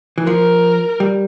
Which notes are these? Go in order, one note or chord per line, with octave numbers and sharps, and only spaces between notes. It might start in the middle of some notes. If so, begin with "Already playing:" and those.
E3
F3 A#4
G3